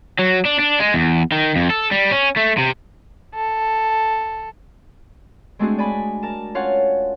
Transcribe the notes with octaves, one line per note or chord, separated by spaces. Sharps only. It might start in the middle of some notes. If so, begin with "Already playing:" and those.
F#3
D4
D4
G#3
E2
D#3
F2
A4
G3
C#4
A3
C3
A4
G#3 A3 C4 D4 F#4 G#4
D5 G#5 B5
A#4 A5
C#4 F4 C#5 F5 F#5